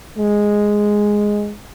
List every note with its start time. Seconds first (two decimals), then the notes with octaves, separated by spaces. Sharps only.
0.18 G#3